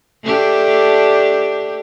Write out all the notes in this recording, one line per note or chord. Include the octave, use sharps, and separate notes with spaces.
A3 D4 G4